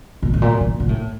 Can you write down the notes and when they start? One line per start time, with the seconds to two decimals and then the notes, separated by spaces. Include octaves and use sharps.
0.23 A#2
0.34 A2
0.42 A#2
0.61 A#2
0.80 A#2
0.89 A2